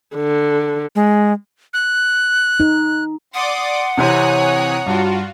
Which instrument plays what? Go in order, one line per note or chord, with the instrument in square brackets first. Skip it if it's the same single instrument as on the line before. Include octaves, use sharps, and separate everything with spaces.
[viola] D3
[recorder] G#3
F#6
[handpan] D#4
[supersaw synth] D5 D6 D#6 [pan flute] F#5 [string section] C6
[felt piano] C3 E3 C4 [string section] C#5 A#5 [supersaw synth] G#5 D#6 F#6
[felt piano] G2 [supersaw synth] F4 F#4